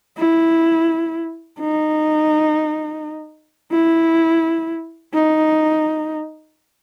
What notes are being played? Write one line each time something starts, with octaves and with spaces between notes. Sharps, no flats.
E4
D#4
E4
D#4